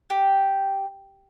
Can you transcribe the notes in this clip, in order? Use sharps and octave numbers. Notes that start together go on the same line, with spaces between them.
G4